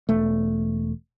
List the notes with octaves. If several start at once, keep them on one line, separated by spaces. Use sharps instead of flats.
E1 A3